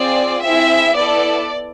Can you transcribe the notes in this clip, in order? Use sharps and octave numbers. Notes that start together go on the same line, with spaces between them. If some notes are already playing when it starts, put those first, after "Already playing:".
Already playing: C4 F4 G#4 D5
C4 E4 G#4 E5
B3 E4 A4 D5